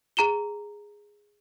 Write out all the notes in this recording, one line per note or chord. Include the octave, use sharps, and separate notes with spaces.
G#4 A#5 E7 G7